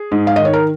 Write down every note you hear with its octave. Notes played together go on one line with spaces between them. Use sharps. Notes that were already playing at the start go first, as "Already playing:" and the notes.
Already playing: G#4
G#2
F5
D#3 D#5
C#5
A#4